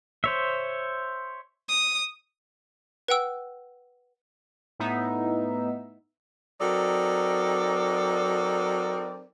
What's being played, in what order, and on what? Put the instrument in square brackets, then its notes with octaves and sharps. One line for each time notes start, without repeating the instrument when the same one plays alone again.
[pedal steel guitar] C5 C#5 E5
[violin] D#6
[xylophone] B4 F#5 G5 E6
[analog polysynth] A2 B3 D#4 E5
[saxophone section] F#3 C4 D#4 A4 A#4 D5